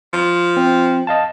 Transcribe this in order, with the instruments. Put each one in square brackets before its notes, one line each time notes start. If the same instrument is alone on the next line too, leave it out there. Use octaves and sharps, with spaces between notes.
[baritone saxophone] F3
[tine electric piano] C4
D#5 F5 A5